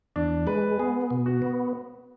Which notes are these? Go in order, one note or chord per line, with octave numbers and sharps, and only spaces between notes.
E2 D4
G#3 B4
B3 G#4
B2
F#4
B3